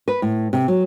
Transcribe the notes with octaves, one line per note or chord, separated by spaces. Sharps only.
B4
A2
C3
F#3